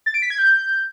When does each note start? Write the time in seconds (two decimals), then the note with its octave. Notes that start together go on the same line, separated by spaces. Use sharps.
0.06 A6
0.14 D7
0.22 B6
0.30 G#6
0.38 G6